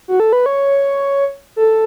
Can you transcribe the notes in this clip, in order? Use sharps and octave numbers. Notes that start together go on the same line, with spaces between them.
F#4
A4
B4
C#5
A4